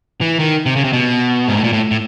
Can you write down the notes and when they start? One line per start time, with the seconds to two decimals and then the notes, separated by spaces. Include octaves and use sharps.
0.21 E3
0.39 D#3
0.66 C3
0.76 C#3
0.84 C3
0.93 B2
1.48 G#2
1.56 A2
1.64 A#2
1.73 A2
1.91 A2